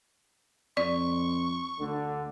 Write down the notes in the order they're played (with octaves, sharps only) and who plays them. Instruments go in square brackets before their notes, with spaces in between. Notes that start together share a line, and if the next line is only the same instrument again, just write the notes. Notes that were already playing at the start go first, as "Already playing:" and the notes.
[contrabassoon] F2 [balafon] D5 [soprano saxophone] C#6
[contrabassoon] D2 [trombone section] D3